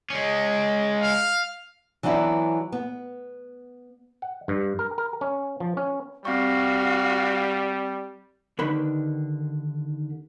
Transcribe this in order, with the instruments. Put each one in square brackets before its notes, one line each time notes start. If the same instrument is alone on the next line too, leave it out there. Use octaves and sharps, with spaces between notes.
[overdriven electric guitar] G#3 C#4
[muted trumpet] F5
[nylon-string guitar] E3 F#3 B3 D4 E4
B3
[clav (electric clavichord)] F#5
G2
A#4
A#4
C#4
F3
C#4
[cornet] G3 [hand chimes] C4 C#6 [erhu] F#4 [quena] F5
[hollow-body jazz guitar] D#2 D3 D#3 B4 B5